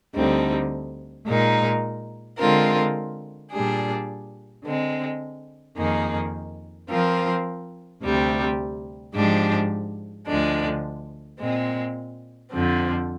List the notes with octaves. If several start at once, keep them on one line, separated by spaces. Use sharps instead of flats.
D2 D3 G3 C4 D#4
A#2 G#3 D#4 A#4
D3 G#3 C4 F4 A#4
A#2 G3 D4 G#4
D3 G#3 C4
F2 D#3 A#3 D#4 G#4
F3 C4 F4 A#4
D2 C3 G3 C4
G#2 F3 G#3 D4 G4
D2 D3 F3 G#3 D4
A#2 G#3 C4
F2 D3 F3 C4